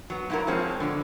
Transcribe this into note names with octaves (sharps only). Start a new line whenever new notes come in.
F#3 B3
G#2 B2 F#3 E4 A#4
F3 G#3 C4 C#4
B2 D3